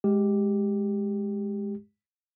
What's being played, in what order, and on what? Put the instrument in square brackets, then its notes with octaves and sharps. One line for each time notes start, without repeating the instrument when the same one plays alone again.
[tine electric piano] G#3 G4